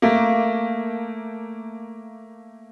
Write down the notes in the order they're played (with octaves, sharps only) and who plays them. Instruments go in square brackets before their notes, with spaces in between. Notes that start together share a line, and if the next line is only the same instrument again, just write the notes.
[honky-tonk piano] A3 A#3